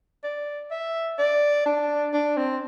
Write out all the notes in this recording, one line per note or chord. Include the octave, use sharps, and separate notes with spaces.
D5
E5
D5
D4
D4
C4